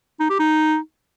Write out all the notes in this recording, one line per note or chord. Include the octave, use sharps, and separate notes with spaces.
D#4
G4
D#4